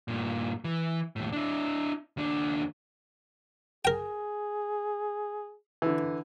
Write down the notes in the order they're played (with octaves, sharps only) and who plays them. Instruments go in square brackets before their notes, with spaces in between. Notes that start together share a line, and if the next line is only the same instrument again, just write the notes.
[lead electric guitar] G2 A#2
E3
D#2 A2
D4 E4
D#2 D4
[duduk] G#4 [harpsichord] A#4 G5
[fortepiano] D3 E3